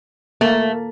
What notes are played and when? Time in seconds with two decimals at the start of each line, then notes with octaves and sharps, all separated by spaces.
0.41 A3 A#3